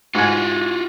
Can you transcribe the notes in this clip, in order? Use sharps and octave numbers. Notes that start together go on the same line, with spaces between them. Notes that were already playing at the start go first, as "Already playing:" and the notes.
G#2 F4 F#4 G#5